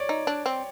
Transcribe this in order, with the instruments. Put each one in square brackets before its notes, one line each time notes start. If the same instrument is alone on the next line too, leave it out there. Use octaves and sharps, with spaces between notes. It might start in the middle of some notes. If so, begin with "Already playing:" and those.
Already playing: [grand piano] C#5 D5
[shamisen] D#4
D4
C4